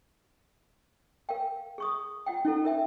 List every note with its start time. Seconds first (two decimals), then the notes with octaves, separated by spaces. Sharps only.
1.29 A#4 F5 G5
1.78 G#4 C#6 D#6
2.26 F4 F#5 G5
2.45 C#4 D#4 E4 A4
2.65 A#4 E5 G5